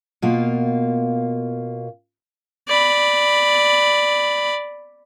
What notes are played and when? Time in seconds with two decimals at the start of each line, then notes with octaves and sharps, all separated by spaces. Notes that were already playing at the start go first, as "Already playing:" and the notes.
0.22 B2 A#3 F4
2.68 D5 B5